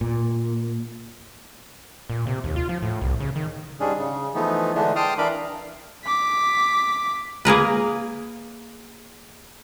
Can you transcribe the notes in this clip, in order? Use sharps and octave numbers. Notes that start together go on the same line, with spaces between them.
A#2
A#2
C3
D#2
F4
F3
A2
C2
C#3
D#3
G#2 G3 G#3 C#4 D4 G#4
C#3
E3 F3 A3 B3 D#4
D3 E3 G#3 A3 D4
G5 A5 C6 D6 D#6 F6
E3 D4 A#4 F5 B5 D6
D6 B6
A#3 G#4 A#4 B4